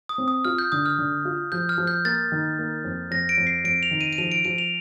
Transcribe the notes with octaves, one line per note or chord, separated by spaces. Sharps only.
D#6
C4
D#6
F4 F6
G6
D3 D#6
F6
D3
F4
F3 G6
F6
F3
G6
A#3 A6
D#3
A#3
F2
F2 A#6
D7
F2
C7
F2 D7
F7
D#3
D#7
D#7
F3 F7
D7
F3 D#7
F7